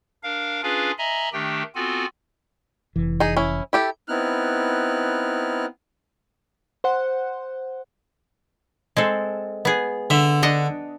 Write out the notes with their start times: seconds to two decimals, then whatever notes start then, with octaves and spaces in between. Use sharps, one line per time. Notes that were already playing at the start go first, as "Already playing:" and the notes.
0.23 D4 A#4 F5
0.63 C#4 D4 F4 G#4 B4 F5
0.98 D#5 E5 G#5 A#5 B5
1.33 D#3 A3 D4 G4 G5
1.75 B3 C4 F4 F#4 A4 G#5
2.96 F1 E3
3.20 D#4 G#4
3.37 C#4 E4
3.73 E4 G4 A4
4.08 B3 C4 D#4 E4 F6 F#6
6.84 C5 F#5
8.97 G#3 C4 A4
9.65 B3 G#4
10.10 D3 E5
10.43 D4 D#5 F#5